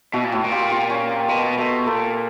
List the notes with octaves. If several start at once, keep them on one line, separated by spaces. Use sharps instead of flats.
B2 E4 F#4
A#2
A2 E4 F#4
A#2
F4 G4
F4 G4
C#4
C4
B2 A#3
B2 A3
A#2 A3